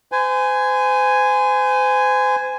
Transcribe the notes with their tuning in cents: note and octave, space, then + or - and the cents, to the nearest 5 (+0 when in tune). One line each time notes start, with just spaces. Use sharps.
C5 -40 G#5 +0